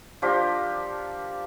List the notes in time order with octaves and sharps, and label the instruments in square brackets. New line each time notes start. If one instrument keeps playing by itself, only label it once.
[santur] F3 D4 G4 A#4